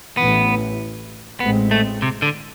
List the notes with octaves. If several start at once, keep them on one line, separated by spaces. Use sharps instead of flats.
A1 A2 E3 B3
A1 A2 G#3 B3 C4
A3
C3
D3